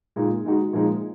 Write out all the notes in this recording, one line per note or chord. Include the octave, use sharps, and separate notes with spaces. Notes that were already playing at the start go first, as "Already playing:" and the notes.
A#2 G#3 D#4
D#3 G#3 D#4 F#4
A#2 F3 G#3 D#4